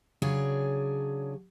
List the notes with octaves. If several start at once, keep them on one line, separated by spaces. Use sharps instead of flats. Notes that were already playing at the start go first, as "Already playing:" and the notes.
C#3 F#3 D4 G#4 C#5